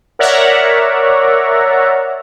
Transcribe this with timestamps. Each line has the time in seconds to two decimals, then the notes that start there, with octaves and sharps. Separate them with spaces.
0.19 A#4 C#5 D5 E5 F#5 A#5